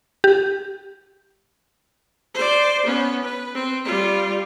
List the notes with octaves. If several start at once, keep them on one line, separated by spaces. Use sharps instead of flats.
G4
C5 D5
B3 C#4
B4
C4
G3 F4